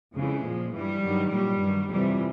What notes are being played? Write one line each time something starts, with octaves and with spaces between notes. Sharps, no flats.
F2 C#3 E3 G#3
A#2 F3
G2 E3 G3
G2 D#3 F#3
A#2 F#3 G3
G2 D#3 F#3
F2 C3 E3 G3